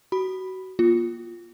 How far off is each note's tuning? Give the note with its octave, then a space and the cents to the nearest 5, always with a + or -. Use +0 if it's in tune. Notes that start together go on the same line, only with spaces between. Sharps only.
F#4 +25 B5 +0
A#3 +30 F4 +0